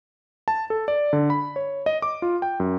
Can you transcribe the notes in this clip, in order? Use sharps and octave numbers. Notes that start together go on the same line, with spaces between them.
A5
A4
D5
D3
B5
C#5
D#5
D6
F4
G5
F#2